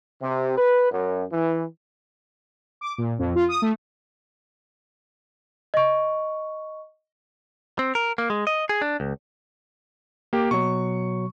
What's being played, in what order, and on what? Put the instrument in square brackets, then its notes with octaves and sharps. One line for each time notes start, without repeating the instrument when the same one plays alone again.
[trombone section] C3
B4
F#2
E3
[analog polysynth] D6
A#2
F2
F4
D#6
A3
[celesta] D#5 C#6
[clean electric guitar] C4
A#4
A#3
G#3
D#5
G#4
D4
C#2
[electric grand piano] A#3 G4
[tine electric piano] B2 F#3 [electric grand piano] C#6